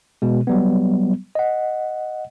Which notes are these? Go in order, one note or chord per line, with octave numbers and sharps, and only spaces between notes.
B2 G#3
F#3 G3 B3
D#5 F#5